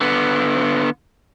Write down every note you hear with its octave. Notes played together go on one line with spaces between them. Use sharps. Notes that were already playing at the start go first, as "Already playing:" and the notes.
D3 B3